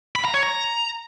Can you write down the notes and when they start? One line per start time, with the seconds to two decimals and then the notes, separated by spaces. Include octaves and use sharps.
0.16 B5
0.25 A#5
0.34 C#5
0.43 A#5